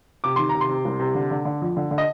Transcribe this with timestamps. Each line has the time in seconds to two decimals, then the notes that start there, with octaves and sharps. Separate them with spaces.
0.24 C3 D6
0.36 D#3 C6
0.49 A#5
0.55 C3
0.61 C6
0.69 C3
0.85 C2
1.00 C3
1.15 D3
1.31 D3
1.45 D3
1.62 F2
1.77 D3
1.91 D3
1.98 D#5